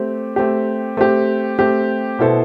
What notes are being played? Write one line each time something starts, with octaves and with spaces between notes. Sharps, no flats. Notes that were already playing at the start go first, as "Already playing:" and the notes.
Already playing: A3 C4 G4
A3 C4 G4
A3 C4 G4
A3 C4 G4
B2 B3 E4 A4 C5